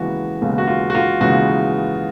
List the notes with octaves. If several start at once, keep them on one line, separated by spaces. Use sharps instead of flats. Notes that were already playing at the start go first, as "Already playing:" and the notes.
Already playing: D#2 C#3 E3 G#3 B3 F#4
D#2 C#3 E3 G#3 B3
F#4
F4
F#4
F4
D#2 C#3 E3 G#3 B3 F#4